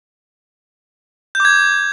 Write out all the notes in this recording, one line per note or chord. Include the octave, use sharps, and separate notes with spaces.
D6 G6 G#6